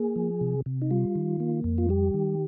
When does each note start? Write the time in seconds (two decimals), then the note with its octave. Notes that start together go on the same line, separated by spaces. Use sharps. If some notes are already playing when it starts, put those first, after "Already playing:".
Already playing: A#3 G#4
0.16 F3
0.41 C3
0.66 C3
0.82 D#4
0.91 G3 F4
1.15 D#3
1.40 A#3
1.64 F2
1.78 F4
1.89 G3 G4
2.14 D#3